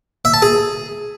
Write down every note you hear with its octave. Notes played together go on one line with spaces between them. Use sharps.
E5
A5
G#4